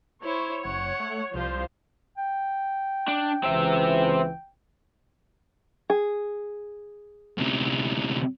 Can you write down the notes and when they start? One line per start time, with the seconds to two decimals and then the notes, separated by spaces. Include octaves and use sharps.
0.24 E4 C5 C#5
0.65 F#1 F#5
1.00 A3
1.34 C2 F3 G3 F4 C5
2.18 G5
3.08 D4
3.44 C#2 E3 C4 E5
5.90 G#4
7.38 D2 C3